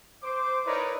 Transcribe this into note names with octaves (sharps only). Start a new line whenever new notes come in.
C5 D6
D#4 E4 A#4 B4 C#5 D5